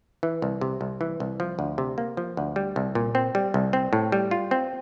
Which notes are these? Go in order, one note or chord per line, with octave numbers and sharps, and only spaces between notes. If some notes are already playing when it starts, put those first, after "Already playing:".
E3
C2
C3
C2
E3
C2
F3
D2
C3
A#3
F3
D2
G3
C2
A#2
C4
G3
C2
C4
A2
G3
F4
C4